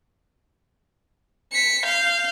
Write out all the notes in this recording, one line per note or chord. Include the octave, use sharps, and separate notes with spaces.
B6 C#7
F5 G6